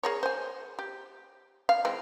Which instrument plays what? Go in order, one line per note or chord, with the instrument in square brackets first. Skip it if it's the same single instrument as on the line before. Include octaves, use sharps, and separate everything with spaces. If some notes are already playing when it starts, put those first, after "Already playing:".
[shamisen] G#4 A#4 C#5
C5 G#5
G4
F5
E3 G#3 C4